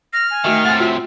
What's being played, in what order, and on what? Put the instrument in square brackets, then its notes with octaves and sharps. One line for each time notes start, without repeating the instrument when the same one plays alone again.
[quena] F6 [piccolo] A#6
[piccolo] G#5
[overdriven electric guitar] D#3 [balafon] A3 F#4 E5
[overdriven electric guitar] A2 C3 [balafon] F#5 G#5 [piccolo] A6
[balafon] F4 F#4 [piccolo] E5